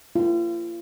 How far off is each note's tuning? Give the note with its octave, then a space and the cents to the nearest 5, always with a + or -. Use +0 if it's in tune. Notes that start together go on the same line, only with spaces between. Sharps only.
F4 -40